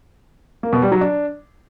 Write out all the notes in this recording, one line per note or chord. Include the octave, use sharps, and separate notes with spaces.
A#3
B2
G3
F#3
D4